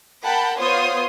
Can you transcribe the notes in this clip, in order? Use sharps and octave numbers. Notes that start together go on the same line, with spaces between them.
A#4 F#5 G5 A5 B5
B3 F4 C5 C#5 C6 D#6